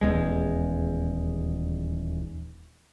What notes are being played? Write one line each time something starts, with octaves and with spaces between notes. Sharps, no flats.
D#1 E2 G#3